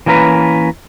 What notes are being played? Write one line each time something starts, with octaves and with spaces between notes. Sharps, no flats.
E3 A#3 C#4 A#4 B4